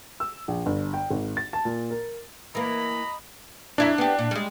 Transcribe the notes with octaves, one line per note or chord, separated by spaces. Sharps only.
E6
A#1
G1
G5
G#1
A6
A5
A#2
A#4
E3 A#3 D#5 A#5 B5
F2 D4 E4 A#4
B3 G4
A#2
G3 G#3